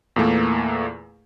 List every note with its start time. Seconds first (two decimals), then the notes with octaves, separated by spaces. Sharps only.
0.16 E2 A#2 E3 A3 A#3